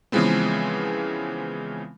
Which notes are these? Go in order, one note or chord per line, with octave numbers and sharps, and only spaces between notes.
C#3 E3 F3 G#3 B3 C4